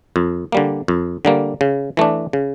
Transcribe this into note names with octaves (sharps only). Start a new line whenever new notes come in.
F2
D3 G3 A#3
F2
D3 G3 A#3
C#3
E3 A3 D4
C#3